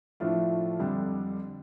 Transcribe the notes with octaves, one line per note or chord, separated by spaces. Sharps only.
A2 F3 A3 D4 F4
F2 D3 G3 D4